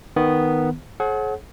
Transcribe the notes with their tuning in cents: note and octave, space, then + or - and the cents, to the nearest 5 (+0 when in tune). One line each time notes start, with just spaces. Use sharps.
D#3 +0 B3 +0
G#4 +45 C#5 -45 F#5 +0